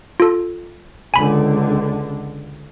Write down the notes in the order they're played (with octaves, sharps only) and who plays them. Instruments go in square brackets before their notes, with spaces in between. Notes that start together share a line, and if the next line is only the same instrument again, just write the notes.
[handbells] F4 A4
[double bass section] C#2 D3 [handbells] G#5 B5